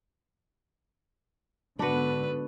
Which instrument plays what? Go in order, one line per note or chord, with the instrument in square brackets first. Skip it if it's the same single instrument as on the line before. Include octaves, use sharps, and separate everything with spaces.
[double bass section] G#2 D3 B3 [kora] D4 F#4 [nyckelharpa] B4